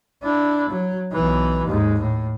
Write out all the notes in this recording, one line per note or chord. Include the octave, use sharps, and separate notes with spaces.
D4 E4
F#3
B1 E3
D#2 G#2
A2